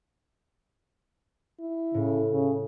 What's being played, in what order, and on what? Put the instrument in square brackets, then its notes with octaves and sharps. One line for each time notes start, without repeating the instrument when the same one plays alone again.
[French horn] E4
[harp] A2 [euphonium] C#3
[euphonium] C#3